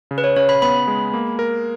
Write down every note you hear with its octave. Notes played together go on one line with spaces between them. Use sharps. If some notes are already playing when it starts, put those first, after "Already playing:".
C#3
B4
C#5
C#3 C#5
B5
B3 B5
G#3
A#3
A#4